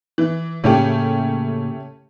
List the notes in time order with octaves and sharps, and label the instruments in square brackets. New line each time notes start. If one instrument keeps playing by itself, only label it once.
[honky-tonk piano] E3
[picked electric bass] A2 C#3 A#3 [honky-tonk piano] A3 C#4 G4